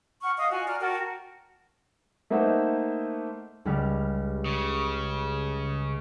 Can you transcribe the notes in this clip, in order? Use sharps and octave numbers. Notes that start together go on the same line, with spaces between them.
F#5 C#6 F6
D#5 F5 D#6
F4 F#4 G#5
D5 A#5 F6
F#4 A#4 G5 A5
A3 A#3 D#4 C5 E5 F#5
C#2 G3 F6
C#3